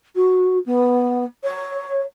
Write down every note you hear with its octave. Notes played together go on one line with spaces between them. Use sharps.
F#4
B3
C#5